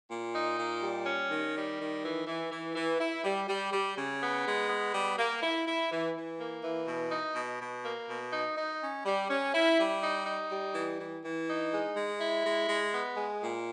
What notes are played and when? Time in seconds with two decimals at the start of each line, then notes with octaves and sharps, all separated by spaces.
0.09 A#2
0.34 D#4
0.58 A#2
0.81 G3
1.06 C#4
1.30 D#3
1.55 G3
1.79 D#3
2.03 E3
2.27 E3
2.51 E3
2.75 E3
3.00 E4
3.24 G3
3.48 G3
3.72 G3
3.96 C#3
4.21 B3
4.45 G#3
4.69 B3
4.93 G3
5.18 A#3
5.41 E4
5.66 E4
5.91 E3
6.14 E3
6.39 A#3
6.63 E3
6.87 B2
7.11 D#4
7.35 B2
7.60 B2
7.84 A#3
8.08 B2
8.32 D#4
8.57 D#4
8.80 C#4
9.05 G3
9.29 C#4
9.54 E4
9.78 G3
10.02 D#4
10.26 D#4
10.50 G3
10.74 E3
10.99 E3
11.23 E3
11.48 D#4
11.72 G#3
11.96 G#3
12.20 E4
12.45 G#3
12.69 G#3
12.93 B3
13.17 G#3
13.42 A#2